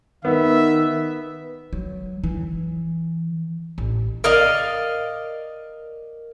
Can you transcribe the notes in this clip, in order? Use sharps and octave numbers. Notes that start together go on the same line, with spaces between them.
D#3 B3 E5
F#3
E3
A1
A#4 D5 D#5 F5